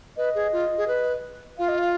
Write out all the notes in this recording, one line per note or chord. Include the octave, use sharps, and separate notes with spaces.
B4 D#5
G#4
F4
G#4
B4
F4 F5
D#5
F5